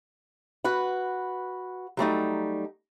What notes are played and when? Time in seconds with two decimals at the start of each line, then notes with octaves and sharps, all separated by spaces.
0.64 F#4 B4 F#5
1.97 F#3 G3 A3 D#4